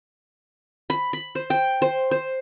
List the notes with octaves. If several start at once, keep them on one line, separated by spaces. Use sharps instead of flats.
B5
B5
C5
G5
C5
C5